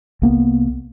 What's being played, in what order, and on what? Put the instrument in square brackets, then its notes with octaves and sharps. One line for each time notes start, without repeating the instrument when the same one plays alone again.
[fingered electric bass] C2 A#3 B3